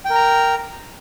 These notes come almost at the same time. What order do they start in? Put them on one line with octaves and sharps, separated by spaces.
G5 A#4 A#5